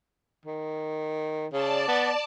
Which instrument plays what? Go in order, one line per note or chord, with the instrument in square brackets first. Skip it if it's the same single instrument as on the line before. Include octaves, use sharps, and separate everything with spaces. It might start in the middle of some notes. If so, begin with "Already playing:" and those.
[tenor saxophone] D#3
[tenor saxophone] C#3 [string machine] D5 A5
[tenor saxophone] B3